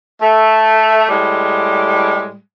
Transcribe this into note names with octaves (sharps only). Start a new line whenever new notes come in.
A3
A2 G3 G#3